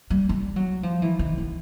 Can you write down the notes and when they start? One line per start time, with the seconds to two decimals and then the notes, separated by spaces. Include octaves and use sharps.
0.10 G3
0.29 G3
0.56 F#3
0.83 F3
1.02 E3
1.19 D#3
1.38 D#3